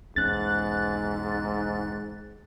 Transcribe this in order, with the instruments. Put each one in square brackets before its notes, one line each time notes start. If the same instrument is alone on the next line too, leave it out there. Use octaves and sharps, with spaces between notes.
[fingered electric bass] B1 E2 C#4 [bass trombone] G#2 [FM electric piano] F#6 A6